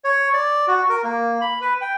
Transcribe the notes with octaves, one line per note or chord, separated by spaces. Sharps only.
C#5
D5
F#4
A#4
A#3
B5
B4
G5